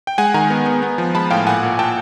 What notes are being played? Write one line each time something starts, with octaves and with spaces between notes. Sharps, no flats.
G5
G#3 F#5 G#5
D#3 G#5 A#5
B3
B3
B3
F3
G#3 A5 B5
A2 F5 G5
A#2 F#5 G#5
A#2
A#2 G5 A5